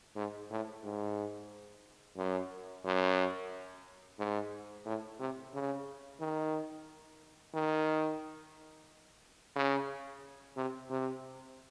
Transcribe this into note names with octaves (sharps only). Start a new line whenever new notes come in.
G#2
A2
G#2
F#2
F#2
G#2
A2
C3
C#3
D#3
D#3
C#3
C3
C3